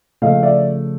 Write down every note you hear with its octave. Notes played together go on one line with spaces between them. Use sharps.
C#3 F3 A3 D#5 F5
D5 E5